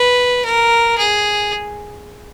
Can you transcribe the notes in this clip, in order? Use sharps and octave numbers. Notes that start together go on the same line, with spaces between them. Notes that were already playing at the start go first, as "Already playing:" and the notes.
Already playing: B4
A#4
G#4